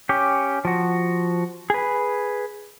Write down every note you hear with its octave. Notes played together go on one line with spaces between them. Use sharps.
C#4 G4
F3 F#4
G#4 B4